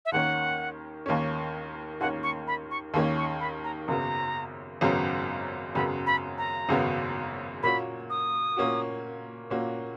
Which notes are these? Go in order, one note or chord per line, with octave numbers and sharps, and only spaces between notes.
E5
D#2 D#3 A#3 C#4 F#5
D#2 D#3 A#3 C#4
D#2 D#3 A#3 C#4 F#5
C#6
B5
C#6
D#2 D#3 A#3 C#4
C#6
B5
A#5
G#1 F#2 C#3 F#3 B3 A#5
G#1 F#2 C#3 F#3 B3
G#1 F#2 C#3 F#3 B3 B5
B5
A#5
G#1 F#2 C#3 F#3 B3
A#2 A#3 C#4 F#4 B5
D#6
A#2 A#3 C#4 F#4
A#2 A#3 C#4 F#4